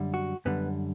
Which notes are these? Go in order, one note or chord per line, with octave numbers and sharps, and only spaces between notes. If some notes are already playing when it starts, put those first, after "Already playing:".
Already playing: F#2 D3 G3
F#4
F#2 D3 G3 B3